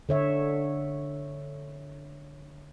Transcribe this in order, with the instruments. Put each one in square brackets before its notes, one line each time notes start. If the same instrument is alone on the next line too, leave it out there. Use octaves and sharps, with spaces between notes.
[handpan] D3 C#5 E5